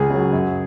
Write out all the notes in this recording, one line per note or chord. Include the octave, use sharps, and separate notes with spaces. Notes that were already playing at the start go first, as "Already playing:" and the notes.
Already playing: C#2 G#4
C#3 F#3
F#2